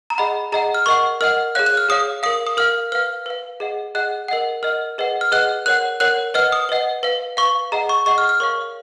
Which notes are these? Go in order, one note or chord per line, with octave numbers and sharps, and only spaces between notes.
A#5
G#4 D#5 F#5 B5
G#4 D#5 F#5 A#5
F6
A#4 D#5 F#5 C#6
A#4 D#5 F#5 F6
G#4 C#5 F5 F#6
F#6
F6
G#4 C#5 F5 D#6
A#4 F5 D#6
D#6
A#4 F5 F6
B4 F5 F6
B4 F5
G#4 D#5 F#5
G#4 D#5 F#5 F#6
A#4 D#5 F#5
A#4 D#5 F#5 F6
G#4 B4 D#5 F#5
F6
G#4 B4 D#5 F#5 F#6
A#4 C#5 F#5 F#6
A#4 C#5 F#5 F#6
B4 D#5 F#5 F6
D#6
B4 D#5 F#5
B4 F5
B4 F5 C#6
G#4 D#5 F#5 A#5
C#6
G#4 D#5 F#5 C#6
F6
F6
A#4 C#5 F5 C#6